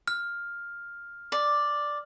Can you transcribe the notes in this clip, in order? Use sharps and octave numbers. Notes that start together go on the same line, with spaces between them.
F6
D5